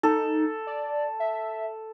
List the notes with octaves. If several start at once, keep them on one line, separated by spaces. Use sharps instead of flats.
D#4 A4
D5
E5